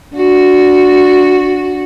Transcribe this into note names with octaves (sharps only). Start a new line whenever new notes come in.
D4 F#4